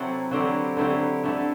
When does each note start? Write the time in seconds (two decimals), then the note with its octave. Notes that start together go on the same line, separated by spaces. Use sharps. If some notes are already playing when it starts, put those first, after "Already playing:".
Already playing: C3 F#3 C4 E4 A4
0.31 D3 F#3 C4 E4 G4
0.77 D3 F#3 C4 E4 G4
1.24 D3 A3 E4